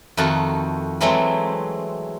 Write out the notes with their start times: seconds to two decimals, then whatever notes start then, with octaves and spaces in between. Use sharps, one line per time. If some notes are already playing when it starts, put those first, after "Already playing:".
0.17 F2 D#3 A3 F#4 A5 A#5
1.01 E3 F#3 G#3 A3 C4